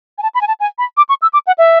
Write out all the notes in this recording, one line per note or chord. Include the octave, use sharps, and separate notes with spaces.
G#5
A5
B5
G#5
A5
G#5
B5
D6
C#6
E6
D6
F#5
E5